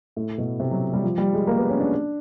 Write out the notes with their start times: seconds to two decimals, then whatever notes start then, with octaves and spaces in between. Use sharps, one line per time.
0.16 A2
0.38 B2
0.60 C3
0.71 F#3
0.93 G3
1.03 F3
1.18 G3
1.33 G#3
1.47 A#3
1.58 B3
1.69 C#4
1.80 D4